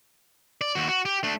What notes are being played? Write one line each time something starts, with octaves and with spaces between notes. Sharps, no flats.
D5
D#2 F#4
F#4
G4
A3 D4